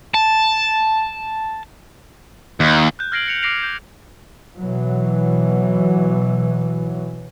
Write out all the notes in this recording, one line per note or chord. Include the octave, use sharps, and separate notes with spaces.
A5
D#2
F#6 G6
F6 G#6 A#6 C7 D7 F#7
A#6 C#7 F7
D6 G6 A#6 C7 D7 F7
G6
B2 E3 F#3